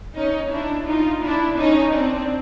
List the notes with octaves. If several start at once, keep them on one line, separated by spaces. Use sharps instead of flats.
C#4 D#4
D4 E4
D#4 F4
D4 E4
C#4 D#4
C4 D4